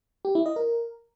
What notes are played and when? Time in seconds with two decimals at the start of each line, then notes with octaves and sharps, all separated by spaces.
0.25 G4
0.35 E4
0.46 D#5
0.56 A#4